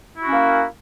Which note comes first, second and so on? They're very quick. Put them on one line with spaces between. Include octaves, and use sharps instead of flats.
E4 F#4 C#4 A#3